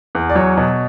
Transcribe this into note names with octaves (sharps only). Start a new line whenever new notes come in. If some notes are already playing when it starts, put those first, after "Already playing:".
E2
D5
F#3 C#5
B2